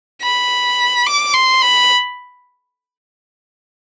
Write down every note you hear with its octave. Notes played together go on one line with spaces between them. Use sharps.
B5
D6
C6
B5